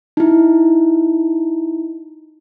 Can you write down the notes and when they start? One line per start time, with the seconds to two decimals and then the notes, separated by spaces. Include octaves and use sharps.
0.17 D#4 E4